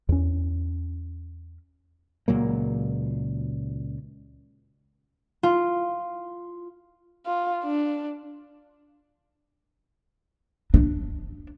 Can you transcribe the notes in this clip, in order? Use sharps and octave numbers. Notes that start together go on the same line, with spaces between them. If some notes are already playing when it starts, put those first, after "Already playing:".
E2 C#4
C#2 A#2 F#3 A#3
F4
F4
D4
D4